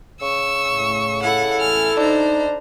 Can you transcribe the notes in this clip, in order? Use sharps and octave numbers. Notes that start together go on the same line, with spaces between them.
C#3 C#6 E6
A2
E4 A4 F#5
A1 E2 G#5 F6
D4 D#4 C5 A#5